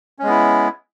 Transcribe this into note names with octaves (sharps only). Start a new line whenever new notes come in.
G#3 B3 C#4 E4